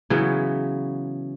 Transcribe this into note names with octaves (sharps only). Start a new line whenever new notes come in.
C#3 E3 F#3 B3